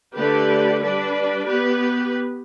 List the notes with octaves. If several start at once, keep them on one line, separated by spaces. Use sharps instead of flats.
D3 A3 G4 B4 D5
G3 D4 B4 D5
B3 G4 B4